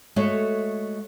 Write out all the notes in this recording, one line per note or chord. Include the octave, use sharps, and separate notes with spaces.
G#3 A3 F#4 A4 C#5 E5